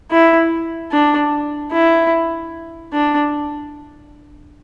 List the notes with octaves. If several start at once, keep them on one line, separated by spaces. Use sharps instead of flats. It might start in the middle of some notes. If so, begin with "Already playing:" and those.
E4
D4
E4
D4